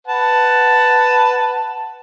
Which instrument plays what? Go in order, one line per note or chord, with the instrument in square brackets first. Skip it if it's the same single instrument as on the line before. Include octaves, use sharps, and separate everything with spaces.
[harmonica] B4 F#5 A5